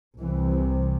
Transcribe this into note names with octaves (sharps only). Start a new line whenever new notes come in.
C2 C3 E3